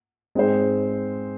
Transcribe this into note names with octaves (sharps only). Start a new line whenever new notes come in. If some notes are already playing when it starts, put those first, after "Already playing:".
G#2 G#3 C4 G#4 C5